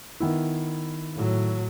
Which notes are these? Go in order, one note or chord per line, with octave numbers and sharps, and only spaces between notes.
D#3 B3 E4
A2 F#3